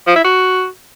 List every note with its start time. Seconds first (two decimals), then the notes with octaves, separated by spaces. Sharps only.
0.07 F3
0.16 E4
0.24 F#4